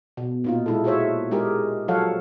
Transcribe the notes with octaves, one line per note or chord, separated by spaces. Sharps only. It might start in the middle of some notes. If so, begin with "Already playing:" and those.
B2
A#2 D#4 F4
G#3 E4 A4
F4 F#4 G#4 C5 C#5 E5
G#3 D#4 G4 G#4 A#4
F3 F#3 A4 C#5 F5 F#5